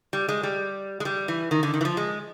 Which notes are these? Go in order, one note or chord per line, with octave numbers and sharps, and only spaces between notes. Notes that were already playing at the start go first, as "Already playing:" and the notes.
G3
G#3
G3
G#3
G3
E3
D#3
D3
D#3
E3
F3
G#3